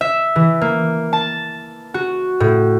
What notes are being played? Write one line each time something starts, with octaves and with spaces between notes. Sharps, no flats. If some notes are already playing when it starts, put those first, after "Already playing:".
E5
E3
A#3
A5
F#4
A2